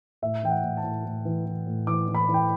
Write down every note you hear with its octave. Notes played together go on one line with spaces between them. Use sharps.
A2 E5
E3 G5
F#5
A2
A5
A2
A2
E3
E3
A2
E3 D6
E3
B5
E3
G5